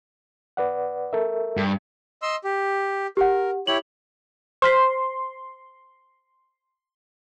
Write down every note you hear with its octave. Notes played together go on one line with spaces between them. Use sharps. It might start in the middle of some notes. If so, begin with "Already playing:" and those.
B4 D5 F#5
A4 A#4 E5
G2
D#5 C6 E6
G4
G4 A#4 F#5
E4 G4 C#5 F#7
C5 C6 F6 B6